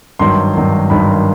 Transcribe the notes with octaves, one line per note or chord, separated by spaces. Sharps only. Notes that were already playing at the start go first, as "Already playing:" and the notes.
G#1 G2 D#3 F#3 C6
G#1 G2 D#3 F#3
G#1 G2 D#3 F#3 B5